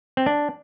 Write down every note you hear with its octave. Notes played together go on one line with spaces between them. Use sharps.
C4
D4